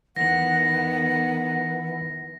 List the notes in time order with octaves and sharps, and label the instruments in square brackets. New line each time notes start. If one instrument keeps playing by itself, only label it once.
[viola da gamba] E2 D#3 B3 [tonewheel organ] E3 [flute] F#5 [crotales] A#6